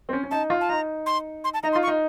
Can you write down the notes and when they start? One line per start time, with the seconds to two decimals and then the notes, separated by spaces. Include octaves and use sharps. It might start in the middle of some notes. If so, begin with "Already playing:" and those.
0.09 C4
0.13 C#4
0.23 C#4
0.31 D#4 A5
0.50 F4
0.61 A5
0.69 D#4 A#5
1.06 C6
1.44 C6
1.54 A5
1.63 D#4 A#5
1.72 C6
1.76 F4
1.83 C#6
1.88 D#4